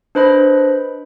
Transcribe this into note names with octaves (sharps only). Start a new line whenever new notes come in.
D4 B4 C5 D#5 B5